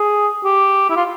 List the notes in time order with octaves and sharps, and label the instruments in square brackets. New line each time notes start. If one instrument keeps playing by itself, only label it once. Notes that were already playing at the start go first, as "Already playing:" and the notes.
Already playing: [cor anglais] G#4
G4
E4
F4